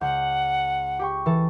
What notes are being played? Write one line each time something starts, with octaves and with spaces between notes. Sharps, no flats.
C#2 F#5 G6
G4 G5 C#6
E3 A4